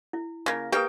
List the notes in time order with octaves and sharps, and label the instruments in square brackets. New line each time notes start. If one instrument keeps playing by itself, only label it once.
[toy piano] E4
[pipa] C#3 A#3
[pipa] A#3 G5 [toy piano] G4 B4 D#6